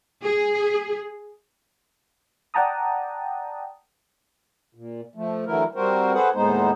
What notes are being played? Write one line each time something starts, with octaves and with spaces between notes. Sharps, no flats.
G#4
D5 F#5 G5 A5 A#5 D#6
A#2
F3 A3
D3 E3 F#3 A3 E4 A#4
G3 C4 F#4 A#4 C5
F#4 G#4 A4 B4 C5 F#5
D#2 A2 G#3 B3 D#4 C5